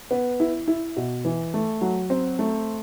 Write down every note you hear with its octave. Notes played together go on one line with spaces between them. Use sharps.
B3
E4
E4
B2
E3
A3
F#3
C4
A3